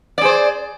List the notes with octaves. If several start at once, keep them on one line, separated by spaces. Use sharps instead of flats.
G#4 C5 D5